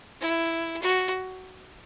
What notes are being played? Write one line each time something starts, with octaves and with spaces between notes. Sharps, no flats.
E4
F#4